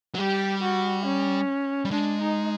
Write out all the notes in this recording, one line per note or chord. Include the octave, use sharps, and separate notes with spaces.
F#3
G3 G4
F#4
C#4
G3
G#3 D4
D#4